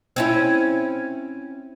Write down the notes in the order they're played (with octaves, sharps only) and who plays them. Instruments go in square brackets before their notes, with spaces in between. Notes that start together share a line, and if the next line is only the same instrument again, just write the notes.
[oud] C4 C#4 E4